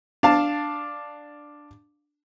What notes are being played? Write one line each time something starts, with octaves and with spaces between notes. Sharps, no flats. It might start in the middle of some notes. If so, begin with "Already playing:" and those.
D4 F5 A5